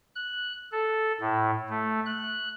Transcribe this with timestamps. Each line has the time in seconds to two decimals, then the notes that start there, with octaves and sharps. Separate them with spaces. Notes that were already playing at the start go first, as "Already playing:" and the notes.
0.16 F#6
0.72 A4
1.20 A2
1.70 A3
2.06 F#6